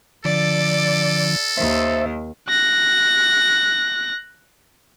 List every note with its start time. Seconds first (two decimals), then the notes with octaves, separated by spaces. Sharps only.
0.25 D3 F3 A4 D5
1.57 D#2 D#3 C5 E5
2.49 F#6 A#6